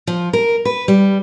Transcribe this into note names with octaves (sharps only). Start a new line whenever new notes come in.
F3
A#4
B4
G3